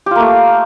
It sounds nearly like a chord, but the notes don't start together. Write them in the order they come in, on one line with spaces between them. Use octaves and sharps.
G4 F4 A#3 A3